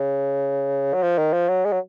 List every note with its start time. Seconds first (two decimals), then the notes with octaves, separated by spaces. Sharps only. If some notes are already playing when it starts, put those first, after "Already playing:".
Already playing: C#3
0.93 F#3
1.02 F3
1.18 D#3
1.33 F3
1.49 F#3
1.65 G#3
1.72 F#3